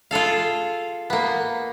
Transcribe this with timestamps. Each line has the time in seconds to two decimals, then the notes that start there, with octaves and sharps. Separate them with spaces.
0.11 F4 G#4 A4 F5
1.10 A#3 B3